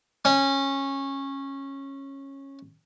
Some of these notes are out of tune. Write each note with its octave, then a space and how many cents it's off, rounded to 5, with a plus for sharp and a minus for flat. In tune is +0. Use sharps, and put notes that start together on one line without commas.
C#4 -15